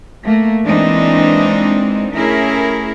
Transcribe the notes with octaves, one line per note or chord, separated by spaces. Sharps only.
A3 A#3
E3 G#3 A#3 C4 D4 D#4
A3 C#4 E4 G#4 A#4